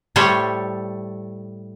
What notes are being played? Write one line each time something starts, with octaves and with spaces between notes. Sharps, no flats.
A2 G3 A3 C5 C#5